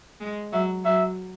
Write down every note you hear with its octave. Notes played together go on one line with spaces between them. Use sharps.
G#3
F#3 E5
F#3 E5